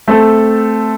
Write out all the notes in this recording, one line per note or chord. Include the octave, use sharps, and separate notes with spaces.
A3 C4 A4